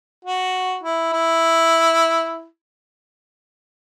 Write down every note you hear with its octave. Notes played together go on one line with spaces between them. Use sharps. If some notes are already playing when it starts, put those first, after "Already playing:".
F#4
E4
E4